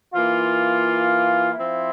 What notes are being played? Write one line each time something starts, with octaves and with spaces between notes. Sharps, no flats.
E3 A#3 F4
F3 C4 E4